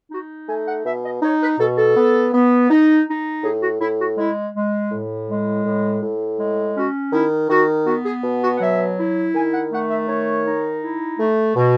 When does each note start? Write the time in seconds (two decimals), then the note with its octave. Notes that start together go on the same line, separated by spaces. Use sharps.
0.11 D#4 F#4
0.48 A3 G#5
0.67 F#5
0.85 B2 E5
1.04 D#5
1.22 D#4 C#5
1.41 B4
1.59 B2 A4
1.77 A4
1.96 B3
2.33 B3
2.70 D#4
3.07 D#4
3.43 A2 G#4
3.61 F#4
3.81 A2 E4
3.99 F#4
4.17 G#3 E4
4.54 G#3
4.91 A2
5.29 G#3
5.65 A2
6.02 A2
6.39 G#3
6.75 C#4 F#4
7.12 D#3 E4
7.49 D#3 F#4
7.86 B3 F#4
8.04 G#4
8.24 B2
8.42 F#4
8.56 F#5
8.61 F#3 E5
8.98 E4
9.34 D#3 G#5
9.52 F#5
9.71 A3 F#5
9.90 E5
10.08 D#3 C#5
10.46 D#4
10.82 E4
11.20 A3
11.56 B2